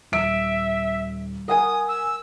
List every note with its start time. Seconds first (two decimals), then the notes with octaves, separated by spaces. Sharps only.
0.12 D#1 E5 D7
1.48 A#4 F#5 G#5 D#6
1.88 E6